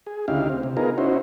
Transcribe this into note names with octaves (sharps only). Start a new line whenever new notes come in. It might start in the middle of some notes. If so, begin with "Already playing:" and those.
G#4
D2 C#3 D#4 E4 G4 F5
C4
C3
B3 D#4 F4 G#4 A#4
C#4 D#4 E4 F#4 C5